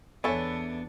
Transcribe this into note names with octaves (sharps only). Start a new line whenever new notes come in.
E2 B3 D4 E4 A4 C#5 G#5 C#6